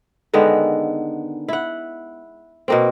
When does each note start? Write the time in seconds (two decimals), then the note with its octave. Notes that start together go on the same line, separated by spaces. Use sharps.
0.33 D3 D#3 G#3 B3
1.49 E4 F#5
2.68 B2 A#3 C4